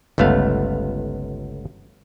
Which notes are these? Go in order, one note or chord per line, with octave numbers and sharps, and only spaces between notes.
G1 C#2 A3 B3 F5